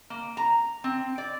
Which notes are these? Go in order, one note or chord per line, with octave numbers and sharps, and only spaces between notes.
A#3
A#5
C4
D5